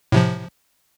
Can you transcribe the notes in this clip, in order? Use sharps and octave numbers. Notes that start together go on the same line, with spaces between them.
A2 C3 F3